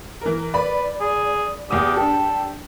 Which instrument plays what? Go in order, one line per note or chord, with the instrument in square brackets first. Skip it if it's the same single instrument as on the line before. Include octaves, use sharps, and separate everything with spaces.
[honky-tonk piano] E3 A#4
[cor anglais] B4 [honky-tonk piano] D5 B5
[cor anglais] G#4
[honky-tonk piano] E2 D#6 [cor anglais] G4
[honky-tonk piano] D4 G4 [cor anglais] A4